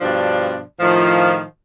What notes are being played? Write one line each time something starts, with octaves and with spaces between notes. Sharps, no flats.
G2 B2 F3 D4
A2 D#3 F3